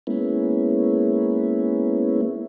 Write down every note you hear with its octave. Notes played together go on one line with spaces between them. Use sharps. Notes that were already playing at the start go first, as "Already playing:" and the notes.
G#3 A#3 B3 C#4 E4